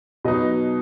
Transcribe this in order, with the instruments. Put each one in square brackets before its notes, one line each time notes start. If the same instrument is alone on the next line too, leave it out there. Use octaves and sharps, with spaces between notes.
[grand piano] B2 F#3 B3 D#4 D#5